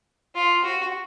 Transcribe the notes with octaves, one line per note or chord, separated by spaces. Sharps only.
F4
F#4